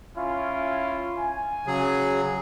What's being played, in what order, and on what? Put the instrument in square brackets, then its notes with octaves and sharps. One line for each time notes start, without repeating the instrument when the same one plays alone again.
[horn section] C#4 E4 F4
G#5
[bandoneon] C#3 F#3 G#4